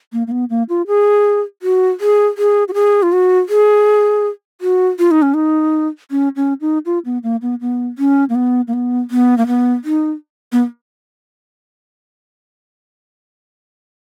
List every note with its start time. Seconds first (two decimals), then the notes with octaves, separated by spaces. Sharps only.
0.13 A#3
0.27 A#3
0.32 B3
0.50 A#3
0.69 F4
0.87 G#4
1.62 F#4
2.00 G#4
2.38 G#4
2.68 F#4
2.74 G#4
3.03 F4
3.13 F#4
3.49 G#4
4.61 F#4
4.99 F4
5.11 D#4
5.22 C#4
5.34 D#4
6.11 C#4
6.36 C#4
6.61 D#4
6.86 F4
7.05 B3
7.23 A#3
7.42 B3
7.61 B3
7.98 C#4
8.29 A#3
8.35 B3
8.68 A#3
8.73 B3
9.11 B3
9.38 A#3
9.47 B3
9.85 D#4
10.52 B3